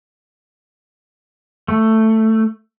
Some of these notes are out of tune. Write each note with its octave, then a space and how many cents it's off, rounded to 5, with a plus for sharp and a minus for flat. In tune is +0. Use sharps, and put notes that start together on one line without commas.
A3 +10